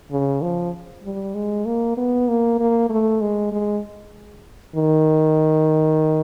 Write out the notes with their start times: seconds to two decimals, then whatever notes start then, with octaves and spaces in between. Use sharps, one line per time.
0.11 C#3
0.42 F3
1.03 G3
1.35 G#3
1.65 A#3
1.97 B3
2.28 A#3
2.59 A#3
2.89 A3
3.21 G#3
3.52 G#3
4.76 D#3